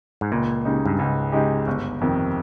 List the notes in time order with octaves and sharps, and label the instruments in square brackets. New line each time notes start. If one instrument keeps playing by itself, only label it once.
[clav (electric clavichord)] G#2
[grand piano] C#2 [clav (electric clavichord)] A#2
[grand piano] C#3 G#3 D#4 G4
[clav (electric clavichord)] G2
[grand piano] C#2 [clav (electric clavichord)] G#2
[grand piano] C#3 G#3 D#4 G4
G1
F2 C3 D#3